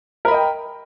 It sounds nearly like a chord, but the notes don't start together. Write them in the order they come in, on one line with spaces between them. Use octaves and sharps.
A#4 B5 D#5 G5